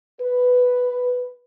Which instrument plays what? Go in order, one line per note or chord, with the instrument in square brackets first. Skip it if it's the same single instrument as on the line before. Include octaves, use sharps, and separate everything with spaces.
[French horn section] B4